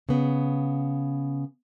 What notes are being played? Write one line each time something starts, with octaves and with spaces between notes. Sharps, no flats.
C#3 B3